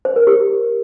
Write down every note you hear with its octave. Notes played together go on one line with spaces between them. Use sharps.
C5
A#4
G4